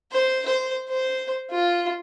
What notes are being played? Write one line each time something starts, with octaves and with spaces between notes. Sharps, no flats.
C5
C5
C5
F4